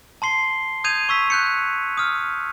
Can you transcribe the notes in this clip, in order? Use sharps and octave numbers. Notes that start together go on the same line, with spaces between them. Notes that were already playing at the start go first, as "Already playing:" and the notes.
A5 C6 C7 G7
D#6 G6 G#6 D#7 F7
C#6 E6 B6
F#6 G6 C#7
D#6 F6